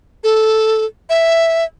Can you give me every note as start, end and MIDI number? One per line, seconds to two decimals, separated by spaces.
0.24 0.85 69
1.10 1.64 76